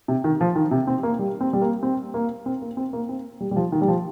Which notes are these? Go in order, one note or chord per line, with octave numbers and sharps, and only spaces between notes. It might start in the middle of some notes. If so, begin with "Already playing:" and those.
C3
D#3
F3
D#3
C3
C4
A#3
G3
C4
G3
A#3
C4
A#3
C4
A#3
C4
A#3
C4
G3
G3
F3
D#3
G3
F3